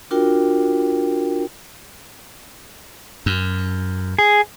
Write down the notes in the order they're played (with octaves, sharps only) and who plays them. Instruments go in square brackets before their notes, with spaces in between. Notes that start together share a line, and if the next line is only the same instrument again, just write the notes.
[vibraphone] D4 F4 F#4 A#4 G5
[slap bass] F#2
[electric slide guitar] G#4